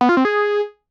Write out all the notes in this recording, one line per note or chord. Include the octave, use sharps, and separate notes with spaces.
B3
F4
C4
G#4